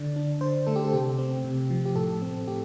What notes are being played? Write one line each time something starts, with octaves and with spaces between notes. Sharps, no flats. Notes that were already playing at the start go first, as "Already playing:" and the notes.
Already playing: D3 D5
D4
D3 C5
A3 A4
G4
A4
C3 G4
C4
C3
F3
G4
A2 A4
C4
A2 G4